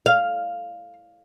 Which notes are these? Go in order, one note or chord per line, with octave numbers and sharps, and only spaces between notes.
F5